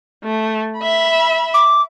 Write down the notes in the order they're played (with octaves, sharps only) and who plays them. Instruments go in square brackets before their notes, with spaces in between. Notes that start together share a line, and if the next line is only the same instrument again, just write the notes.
[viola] A3
E5 B5
[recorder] D6